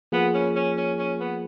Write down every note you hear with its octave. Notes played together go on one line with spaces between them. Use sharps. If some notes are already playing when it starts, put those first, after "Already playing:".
F3 A#3 B3 F4 G#4
C#4
C#4
C#4
C#4
B3